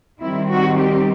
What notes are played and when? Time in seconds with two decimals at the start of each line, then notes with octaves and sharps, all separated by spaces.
0.20 D#3 G3 C4 E4
0.50 F#4
0.79 G4